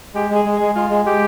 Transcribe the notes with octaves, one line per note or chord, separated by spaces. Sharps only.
G#3 G4
G#3 G#4
G#3
G#4
G#3
G#3 F4
G#3
G#3 G4